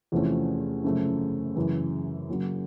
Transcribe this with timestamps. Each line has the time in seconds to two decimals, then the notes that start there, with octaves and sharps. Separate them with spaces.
0.12 E2 C3 F3 A3 C#4
0.84 F#2 C#3 F3 A3
1.56 F#2 C#3 E3
2.29 C#3 F#3 A#3